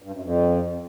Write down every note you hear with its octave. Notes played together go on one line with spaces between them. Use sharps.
G2
F#2
F2